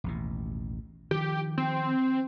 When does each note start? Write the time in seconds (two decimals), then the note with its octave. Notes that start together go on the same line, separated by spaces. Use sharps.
0.04 A1 D#2 B2
1.11 D#3 F3 G4
1.58 C4